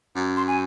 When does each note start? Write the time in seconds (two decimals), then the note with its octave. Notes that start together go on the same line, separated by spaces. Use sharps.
0.15 F#2
0.37 C6
0.48 G#5